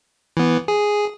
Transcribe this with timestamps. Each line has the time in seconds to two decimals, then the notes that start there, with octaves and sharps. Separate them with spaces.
0.37 E3 B3
0.68 G#4